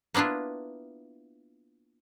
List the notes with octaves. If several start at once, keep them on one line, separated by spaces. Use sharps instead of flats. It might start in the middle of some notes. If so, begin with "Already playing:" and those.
A#3 B3 D4 E4 F4